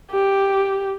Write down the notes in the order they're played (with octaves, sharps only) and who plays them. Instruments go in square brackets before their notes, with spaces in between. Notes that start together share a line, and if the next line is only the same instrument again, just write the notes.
[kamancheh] G4